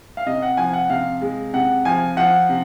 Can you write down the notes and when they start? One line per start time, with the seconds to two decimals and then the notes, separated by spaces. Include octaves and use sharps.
0.17 F5
0.26 C3 D#5
0.42 F#5
0.57 F3 G#5
0.73 F#5
0.89 C3 F5
1.21 G#3
1.53 C3 F#5
1.85 F3 G#5
2.17 F3 F#5
2.49 C3